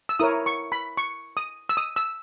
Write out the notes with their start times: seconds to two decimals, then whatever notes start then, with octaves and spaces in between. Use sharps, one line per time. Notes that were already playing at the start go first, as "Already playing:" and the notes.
0.09 E6
0.19 E4 A#4 C#5 D#6
0.46 C#6
0.72 B5
0.97 C#6
1.37 D#6
1.69 E6
1.77 D#6
1.96 E6